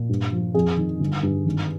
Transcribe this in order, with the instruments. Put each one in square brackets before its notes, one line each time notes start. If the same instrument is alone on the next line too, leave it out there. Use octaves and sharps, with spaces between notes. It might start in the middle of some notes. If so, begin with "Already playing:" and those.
Already playing: [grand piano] A#2
G2
F3
F2 G#4
D#3
G1
G2
G#1